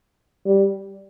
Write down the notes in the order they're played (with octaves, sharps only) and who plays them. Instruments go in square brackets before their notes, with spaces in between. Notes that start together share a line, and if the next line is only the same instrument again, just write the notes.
[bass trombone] G3